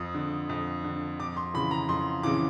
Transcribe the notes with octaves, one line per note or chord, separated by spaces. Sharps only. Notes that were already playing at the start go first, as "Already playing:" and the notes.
Already playing: F2 D#6
D3
F2
D3
F2 D6
C6
C#3 E3 B5
A#5
F2 C6
C#3 E3 D6